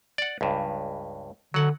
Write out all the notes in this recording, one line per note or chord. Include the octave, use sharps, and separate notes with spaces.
D5 F#5
C#2 G2
D3 F#3 F#5